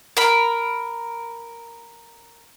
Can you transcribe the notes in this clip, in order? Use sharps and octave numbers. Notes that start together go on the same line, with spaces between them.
A#4 B5